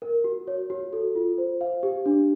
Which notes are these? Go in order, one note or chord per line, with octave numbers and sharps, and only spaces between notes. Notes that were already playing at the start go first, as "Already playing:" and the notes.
A#4
F#4
C#5
F#4
A4
F4
C5
F5
G4
D4